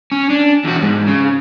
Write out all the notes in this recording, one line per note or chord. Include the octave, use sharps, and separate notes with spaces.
C#4
D4
E2 F#4
G#2
C#3